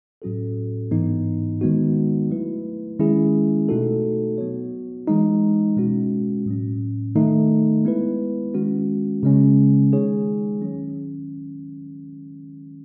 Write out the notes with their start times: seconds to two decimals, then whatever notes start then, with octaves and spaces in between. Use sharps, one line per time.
0.22 A2 F#3 C#4 F#4 A4
0.91 G#2 E3 B3 D#4
1.61 D#3 G#3 B3 D#4 F#4
2.30 F#3 A3 E4 B4
2.99 D#3 G#3 C#4 E4 G#4
3.69 B2 A3 D#4 F#4 A4
4.38 F#3 B3 F#4 C#5
5.07 E3 G#3 D#4
5.77 B2 G#3 C#4 F#4
6.46 A2 F#3 C#4
7.16 D#3 A3 D#4
7.85 G#3 B3 E4 B4
8.54 D#3 G#3 C#4 F#4
9.23 C#3 G#3 C#4
9.93 D#3 G#3 D#4 G#4 C#5
10.61 D#3 F#3 C#4